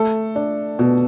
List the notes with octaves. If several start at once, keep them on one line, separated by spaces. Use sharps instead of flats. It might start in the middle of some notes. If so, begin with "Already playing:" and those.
Already playing: A3 A4
D4
B2